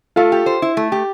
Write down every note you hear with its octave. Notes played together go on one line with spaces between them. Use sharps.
A3 F4 A4
G4
C5
E4
A3
G4